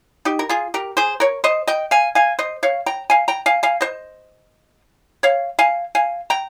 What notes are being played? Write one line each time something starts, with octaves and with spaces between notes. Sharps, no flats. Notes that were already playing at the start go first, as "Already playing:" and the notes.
D#4 G4
A#4
F4 G#4
G4 A#4
G#4 C5
A#4 C#5
C5 D#5
D#5 G5
F5 G#5
F5 G#5
C5 D#5
C#5 F5
G5 A#5
F5 G#5
G5 A#5
F5 G#5
F5 G#5
C5 D#5
C#5 F5
F5 G#5
F5 G#5
G5 A#5